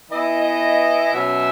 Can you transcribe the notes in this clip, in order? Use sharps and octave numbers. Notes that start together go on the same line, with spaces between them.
E3 B3 E4 D#5
B2 F#3 C#4 E5